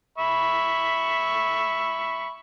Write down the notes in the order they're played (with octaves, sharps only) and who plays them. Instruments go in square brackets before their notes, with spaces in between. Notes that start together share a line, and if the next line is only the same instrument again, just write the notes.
[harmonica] E5 B5 C#6